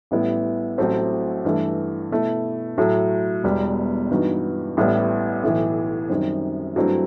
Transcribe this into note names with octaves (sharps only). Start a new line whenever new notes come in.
A1 A2 G3 B3 E4
A1 A2 F#3 A3 C4
G2 E3 A3
B2 A3 E4
A2 F#3 A3
E1 E2 B2 G3
G2 E3 B3 D#4 F#4
A1 A2 G3 B3
B1 A2 E3
F#2 D#3 G3 C4
G2 F#3 A3 C4 E4